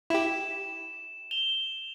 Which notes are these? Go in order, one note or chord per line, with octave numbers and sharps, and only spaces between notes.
E4 G4 E7
E7 F7 G7